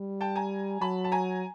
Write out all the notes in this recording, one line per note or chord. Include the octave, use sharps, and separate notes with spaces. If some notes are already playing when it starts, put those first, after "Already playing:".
Already playing: G3
G5 A5
G#5 A#5
F#3 A5 B5
A5
G#5 A#5